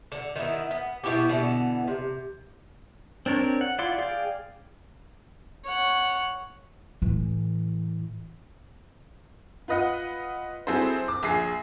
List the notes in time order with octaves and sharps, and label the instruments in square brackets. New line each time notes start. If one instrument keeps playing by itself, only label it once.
[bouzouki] D3
D#3 B3 D#4 E4
B3
B2 B3 E4 G4
B2 D3 E3 B3
C3
[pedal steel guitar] C4 D4 A#4 C#5
F#5
E4 F4 D5 F#5 C6
G#4 D5 F5 G5
[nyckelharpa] C#5 F#5
[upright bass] A2 E3
[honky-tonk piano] F4 B4 D#5 F#5
F#3 C4 E4 G#4 A4 C5
D6
A#1 G#4 C7